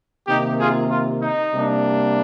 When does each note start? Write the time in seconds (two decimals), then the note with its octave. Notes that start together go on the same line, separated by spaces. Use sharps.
0.28 C3 D#3 A#3 D#4 G4
0.59 F4 G#4
0.90 F4
1.21 D#4
1.52 C3 G3 A#3 D4